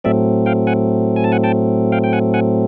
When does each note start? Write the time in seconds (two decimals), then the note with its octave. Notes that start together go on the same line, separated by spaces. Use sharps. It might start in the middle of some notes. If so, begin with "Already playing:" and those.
0.04 A2 F#3 A3 C4 D5 E5
0.46 F5 G5
0.67 F#5 G#5
1.16 G#5
1.24 A5
1.32 F#5 G#5
1.44 G5 A5
1.92 F5 G5
2.04 G5
2.13 F#5 G#5
2.34 F#5 G#5